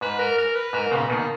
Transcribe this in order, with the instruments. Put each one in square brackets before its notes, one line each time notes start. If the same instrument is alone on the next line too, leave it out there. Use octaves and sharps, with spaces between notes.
[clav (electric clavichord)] G#2 [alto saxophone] B4
[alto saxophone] A#4
A#4
B4
[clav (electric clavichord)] G#2 [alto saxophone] A#4
[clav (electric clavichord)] A#2 C#3 [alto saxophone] B3
[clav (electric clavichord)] B2 D#3 [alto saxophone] A#3